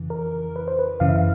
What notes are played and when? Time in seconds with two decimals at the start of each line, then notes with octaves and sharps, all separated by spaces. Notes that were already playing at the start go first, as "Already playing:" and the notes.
Already playing: F2 C#3 E3
0.10 A#4
0.56 B4
0.68 C5
0.79 B4
1.00 F#2 C#3 E3 F5
1.09 E5
1.16 F5